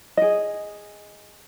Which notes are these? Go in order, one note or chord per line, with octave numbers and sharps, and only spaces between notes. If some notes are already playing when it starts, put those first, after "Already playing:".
G#4 D#5